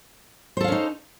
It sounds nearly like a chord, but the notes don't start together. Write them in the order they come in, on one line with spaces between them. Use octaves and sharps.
C5 A4 F5 C#4 D#4